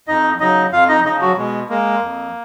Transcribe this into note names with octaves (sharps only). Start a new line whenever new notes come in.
F2 D#4 D#5
C#3 F#3 D#4 D#5
F2 F4 F5
D#4 D#5
C#3 F3 D#4 D#5
F#3 F#4
B2 G#3
G#3 A#3
F2